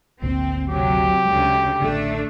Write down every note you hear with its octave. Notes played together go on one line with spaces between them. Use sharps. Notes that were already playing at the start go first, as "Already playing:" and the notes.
G#1 D2 A#2 C4
C3 F#3 G4
D2 C#3 G#3
A1 A2 D3 A3 D4